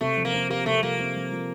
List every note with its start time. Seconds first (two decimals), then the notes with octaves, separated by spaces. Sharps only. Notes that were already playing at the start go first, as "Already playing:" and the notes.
0.01 C3 A3
0.17 F3
0.25 A#3
0.33 C4
0.50 A#3 G4
0.66 C3 A3
0.83 F3 A#3
0.99 C4
1.15 F3
1.32 F3